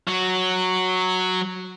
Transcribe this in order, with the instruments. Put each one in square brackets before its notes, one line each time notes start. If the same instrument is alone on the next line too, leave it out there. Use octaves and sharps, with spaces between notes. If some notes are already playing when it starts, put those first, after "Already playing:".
[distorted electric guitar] F#3 F#4